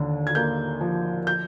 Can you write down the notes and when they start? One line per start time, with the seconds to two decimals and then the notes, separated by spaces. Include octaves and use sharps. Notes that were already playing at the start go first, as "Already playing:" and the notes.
Already playing: D#2 D3
0.27 G#6
0.35 A#3 G6
0.81 F3
1.27 G6